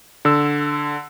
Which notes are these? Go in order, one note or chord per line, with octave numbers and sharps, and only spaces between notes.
D3 E6